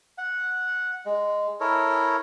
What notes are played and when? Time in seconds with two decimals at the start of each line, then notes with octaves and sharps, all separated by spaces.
0.18 F#5
1.06 G#3
1.60 E4 A4 A#4 C#5